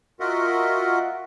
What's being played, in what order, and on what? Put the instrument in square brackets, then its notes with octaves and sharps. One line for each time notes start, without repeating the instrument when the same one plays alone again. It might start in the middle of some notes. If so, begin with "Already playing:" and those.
[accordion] F4 F#4 A#4 D#5 E5 F#5